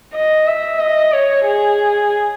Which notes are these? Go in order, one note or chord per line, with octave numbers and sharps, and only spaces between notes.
D#5
E5
D#5
C#5
G#4